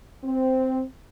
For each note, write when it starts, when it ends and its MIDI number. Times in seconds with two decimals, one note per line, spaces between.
0.24 0.82 60